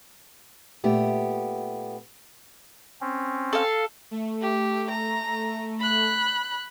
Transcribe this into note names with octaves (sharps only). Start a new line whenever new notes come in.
A#2 A3 B3 G4
C4 C#4
A4 F5
A3
G4
A#5
B5 F#6